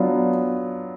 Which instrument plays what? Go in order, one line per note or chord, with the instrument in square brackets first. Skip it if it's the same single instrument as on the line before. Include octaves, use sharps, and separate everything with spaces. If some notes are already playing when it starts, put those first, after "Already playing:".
Already playing: [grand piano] F#3 B3 D4 F4